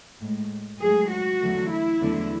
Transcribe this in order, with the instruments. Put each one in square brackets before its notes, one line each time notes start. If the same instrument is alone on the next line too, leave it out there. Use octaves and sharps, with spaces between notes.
[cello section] A2 G#3
G#2 F#3 A3 G#4
F#4
E2 D3 F#3 A3
E4
E2 D3 F#3 A3